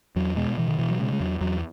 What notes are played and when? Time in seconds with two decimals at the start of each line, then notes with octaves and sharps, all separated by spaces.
0.16 E2 F#3
0.36 B2 G#3
0.58 B2 E3
0.68 D#3
0.79 B2 E3
0.90 F#3
1.00 C#3 G#3
1.13 G#3
1.20 E2 F#3
1.41 E2 F#3